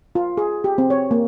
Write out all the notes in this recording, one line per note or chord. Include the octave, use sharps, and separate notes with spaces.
F4
G#4
G4
C4
C#5
A#3